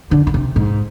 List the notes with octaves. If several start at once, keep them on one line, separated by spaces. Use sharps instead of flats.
D3
D3
C3
G#2